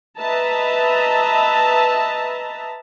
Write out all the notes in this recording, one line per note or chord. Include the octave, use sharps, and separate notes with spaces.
B4 D#5 E5 A5 A#5